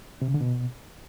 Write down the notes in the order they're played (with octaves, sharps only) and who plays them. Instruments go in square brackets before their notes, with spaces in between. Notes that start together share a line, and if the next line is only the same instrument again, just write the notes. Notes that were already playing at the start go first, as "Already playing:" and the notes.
[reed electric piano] C3
C#3
D3
B2